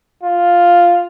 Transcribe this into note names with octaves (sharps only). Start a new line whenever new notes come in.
F4